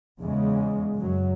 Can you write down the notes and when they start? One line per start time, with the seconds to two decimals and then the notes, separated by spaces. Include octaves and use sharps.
0.20 E2 C#3 G#3
0.95 F#2 F#3